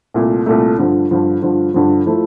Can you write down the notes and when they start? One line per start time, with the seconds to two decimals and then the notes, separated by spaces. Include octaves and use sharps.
0.14 C2 A#2 A3
0.46 C2 A#2 A3
0.78 G2 D3 F3
1.11 G2 D3 F3
1.42 G2 D3 F3
1.74 G2 D3 F3
2.06 F3 A3 E4